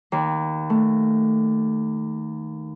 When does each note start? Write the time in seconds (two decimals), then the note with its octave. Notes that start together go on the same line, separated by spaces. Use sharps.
0.12 D#2
0.70 A3